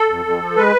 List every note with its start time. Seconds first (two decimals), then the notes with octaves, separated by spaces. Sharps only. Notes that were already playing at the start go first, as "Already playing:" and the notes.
Already playing: A4
0.09 F2
0.25 F2
0.41 F3
0.57 G#3 B4